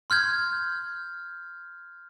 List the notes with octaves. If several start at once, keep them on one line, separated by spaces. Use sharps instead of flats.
C6 F6 G6 G#6